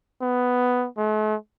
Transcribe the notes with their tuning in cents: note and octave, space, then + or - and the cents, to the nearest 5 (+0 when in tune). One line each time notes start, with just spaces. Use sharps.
B3 +5
A3 -45